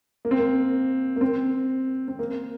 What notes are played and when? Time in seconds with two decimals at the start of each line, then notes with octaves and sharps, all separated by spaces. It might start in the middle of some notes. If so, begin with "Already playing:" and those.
0.25 A#3
0.31 C4
0.39 A#3
1.16 A#3
1.21 C4
2.08 C4
2.19 A#3